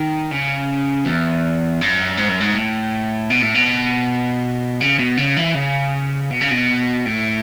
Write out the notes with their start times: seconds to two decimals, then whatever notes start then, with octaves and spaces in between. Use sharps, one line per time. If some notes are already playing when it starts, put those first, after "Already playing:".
Already playing: D#3
0.31 C#3
1.05 E2
1.81 F#2
2.17 G#2
2.29 F#2
2.41 G#2
2.55 A2
3.30 B2
3.42 A2
3.55 B2
4.81 C#3
4.99 B2
5.17 C#3
5.37 E3
5.55 C#3
6.31 B2
6.41 C#3
6.51 B2
7.06 A2